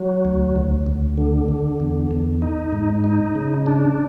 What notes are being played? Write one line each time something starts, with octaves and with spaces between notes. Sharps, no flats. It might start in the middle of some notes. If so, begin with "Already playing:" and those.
Already playing: F#3
D2
D2
D2
D3
D3
E2
E2
D#4
G#2
D#4
C#3
D4